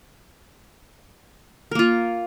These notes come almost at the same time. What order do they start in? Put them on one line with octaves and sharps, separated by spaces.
A#4 A#3 F4